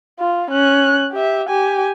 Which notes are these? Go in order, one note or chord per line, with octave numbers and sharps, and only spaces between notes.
F4
C#4 F#6
G4 E5
G4 G#5